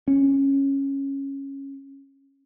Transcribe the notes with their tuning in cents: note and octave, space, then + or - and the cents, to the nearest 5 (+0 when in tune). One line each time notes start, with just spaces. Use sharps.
C#4 -10